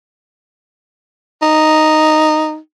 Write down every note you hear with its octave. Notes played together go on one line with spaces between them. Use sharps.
D#4